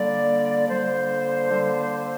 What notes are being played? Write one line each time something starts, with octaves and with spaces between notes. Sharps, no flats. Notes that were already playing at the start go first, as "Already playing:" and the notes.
Already playing: D3 G3 A#3 D5
D3 G3 A#3 C5
D3 G3 A#3